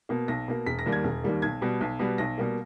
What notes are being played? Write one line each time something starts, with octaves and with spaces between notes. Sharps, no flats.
B2 A#3
B1 A#6
B2 A#3
E1 B6
A#6
D#2 D#3 G3 A#3
G#6
E1
D#2 D#3 G3 A#3
B1 G#6
B2 G3 B3
B1
B2 G3 B3
B1 A#6
B2 G3 A#3